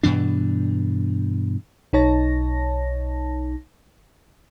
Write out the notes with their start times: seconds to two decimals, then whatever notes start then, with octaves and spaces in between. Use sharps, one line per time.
0.03 G2 B2 E3 D4
1.93 B1 D#4 C#5 A5 A#6